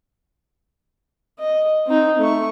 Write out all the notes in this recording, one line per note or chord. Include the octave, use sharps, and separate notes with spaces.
D#5
C4 D#4
A3 C#6